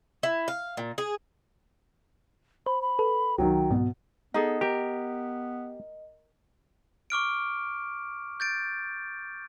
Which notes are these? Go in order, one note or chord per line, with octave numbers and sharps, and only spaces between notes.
E4
F5
A#2
G#4
C5 B5
B5
A4 B4
C2 D#3 F#3 G5
G#2 B2
B3 D#4 G#4 A4 D#5
G4 A#4
C#6 D6 F6 D7
G6 A6 D7